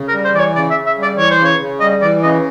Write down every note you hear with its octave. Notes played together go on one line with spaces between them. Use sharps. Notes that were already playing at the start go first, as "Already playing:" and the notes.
Already playing: C#3
A#4
G3
C5
E3 D5
C#5
C#3 D5
E5
C#3
E5
G3 D5
E3 C#5
C5
C#3
C#5
C#3
G3 D#5
E3 D5
C#3 D#5